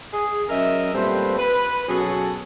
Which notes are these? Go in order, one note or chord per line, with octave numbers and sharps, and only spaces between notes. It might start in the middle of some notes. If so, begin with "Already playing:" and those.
G#4
F#3 C#4 A#4 D#5 E5
A#2 G3 A3 C4 B4 C5
B4
B2 F#3 C#4 F#4 G#4 A4